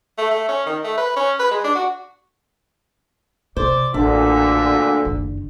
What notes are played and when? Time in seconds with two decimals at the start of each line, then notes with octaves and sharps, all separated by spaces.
0.18 A3
0.31 A3
0.48 C#4
0.66 D#3
0.84 A3
0.98 B4
1.17 C#4
1.39 B4
1.51 G#3
1.64 D4
1.75 F#4
3.57 C3 B3 C5 D5
3.94 A1 D2 A#2 D3 D4 E5
5.05 F#1 D#3